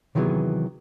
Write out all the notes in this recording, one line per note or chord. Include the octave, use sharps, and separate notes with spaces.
C3 D#3 E3 F#3 B3 G#4